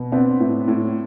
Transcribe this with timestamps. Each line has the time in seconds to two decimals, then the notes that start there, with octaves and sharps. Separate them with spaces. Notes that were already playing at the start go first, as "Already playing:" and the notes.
Already playing: B2
0.12 B3 C4 D4
0.40 A2
0.68 A2